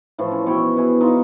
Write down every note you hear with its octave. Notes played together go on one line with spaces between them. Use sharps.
A2 E3 F3
C#4
B2 E4 C#5 G5
B2 E4 G#4
D#4 F4